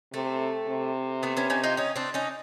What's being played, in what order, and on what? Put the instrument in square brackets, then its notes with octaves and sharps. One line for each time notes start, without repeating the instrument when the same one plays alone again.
[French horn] C3 [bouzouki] A3
[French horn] C3
[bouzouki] A3 B3
B3 C#4
C#4 D#4
D#4 F4
C#4 D#4
C4 D4
C#4 D#4